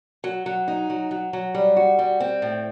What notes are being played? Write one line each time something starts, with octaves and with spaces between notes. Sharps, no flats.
F#3
F#3
D#4
F#3
F#3
F#3
G3
F#4
G3
C4
A2